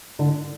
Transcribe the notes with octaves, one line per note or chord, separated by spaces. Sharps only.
D3